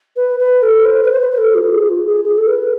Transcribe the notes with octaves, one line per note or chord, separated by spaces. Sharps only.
B4
B4
A4
C5
B4
C5
B4
B4
A4
F4
F4
G#4
F4
G#4
G#4
A4
B4